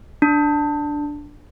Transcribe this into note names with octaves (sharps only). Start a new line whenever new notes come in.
D4